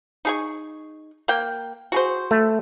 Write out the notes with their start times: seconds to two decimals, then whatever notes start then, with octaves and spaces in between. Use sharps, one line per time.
0.25 D#4 G#4 C#6
1.28 A#3 G5
1.92 F#4 G#4 C5
2.31 A3